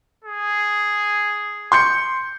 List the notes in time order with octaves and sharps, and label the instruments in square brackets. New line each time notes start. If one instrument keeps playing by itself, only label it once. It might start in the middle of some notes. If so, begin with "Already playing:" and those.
[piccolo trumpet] G#4
[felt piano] C6 G6 C#7